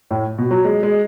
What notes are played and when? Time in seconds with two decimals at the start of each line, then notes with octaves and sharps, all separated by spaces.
0.11 A2
0.38 B2
0.51 F#3
0.65 G#3
0.83 G#3